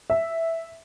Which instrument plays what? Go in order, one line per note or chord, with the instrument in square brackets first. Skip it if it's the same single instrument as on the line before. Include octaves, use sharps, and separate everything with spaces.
[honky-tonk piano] E5